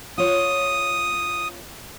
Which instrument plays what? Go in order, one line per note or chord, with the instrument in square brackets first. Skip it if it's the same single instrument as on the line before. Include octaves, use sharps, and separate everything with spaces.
[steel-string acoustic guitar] F4 C#5 [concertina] D#6